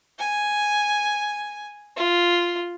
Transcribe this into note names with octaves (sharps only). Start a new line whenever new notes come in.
G#5
F4